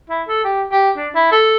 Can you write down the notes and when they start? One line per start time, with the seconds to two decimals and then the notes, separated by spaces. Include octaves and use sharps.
0.09 E4
0.28 A4
0.44 G4
0.71 G4
0.96 D4
1.15 E4
1.31 A4